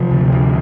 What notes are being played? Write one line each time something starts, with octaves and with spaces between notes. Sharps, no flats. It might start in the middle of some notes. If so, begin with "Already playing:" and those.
Already playing: C3 F3
D2
D2